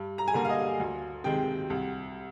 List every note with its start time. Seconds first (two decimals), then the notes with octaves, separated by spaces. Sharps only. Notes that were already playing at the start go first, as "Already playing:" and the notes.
Already playing: G2
0.18 A#5
0.28 G#5
0.34 D3 G3 A#3 A#5
0.45 F5
0.49 D#5
0.80 D2
1.24 C3 D#3 G#3 G5
1.70 C2